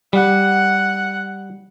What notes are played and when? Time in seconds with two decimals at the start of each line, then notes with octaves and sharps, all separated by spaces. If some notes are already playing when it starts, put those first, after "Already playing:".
0.13 G3 F#5